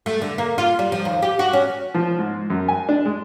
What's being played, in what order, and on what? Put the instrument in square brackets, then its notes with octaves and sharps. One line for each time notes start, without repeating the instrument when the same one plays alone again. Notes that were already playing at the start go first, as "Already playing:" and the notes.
[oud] A3
D3
A#3
F4
G3
F3
D#2
G4
F#4
C#4
[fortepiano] F3
G#2
F#2
G#5
D4
G#3